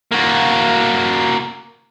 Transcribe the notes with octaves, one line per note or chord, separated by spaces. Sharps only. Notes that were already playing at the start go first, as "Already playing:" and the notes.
A#3 F#4